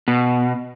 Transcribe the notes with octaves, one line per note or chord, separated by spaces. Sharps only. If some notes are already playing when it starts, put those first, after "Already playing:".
B2